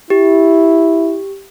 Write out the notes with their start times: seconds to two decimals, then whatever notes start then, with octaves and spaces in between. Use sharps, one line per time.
0.10 E4 G4